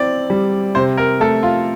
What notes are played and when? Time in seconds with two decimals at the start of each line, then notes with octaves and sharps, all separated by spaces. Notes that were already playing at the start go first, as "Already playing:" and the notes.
Already playing: C4 E4 D5
0.30 G3
0.75 C3 C5
0.97 A#4
1.20 A3 A4
1.43 F4